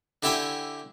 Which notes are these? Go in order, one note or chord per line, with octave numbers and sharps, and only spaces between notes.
D3 E4 G4 E5 G5 G#5